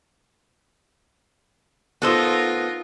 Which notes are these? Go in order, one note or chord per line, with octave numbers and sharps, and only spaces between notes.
B3 D#4 F4 A4 A#4 C5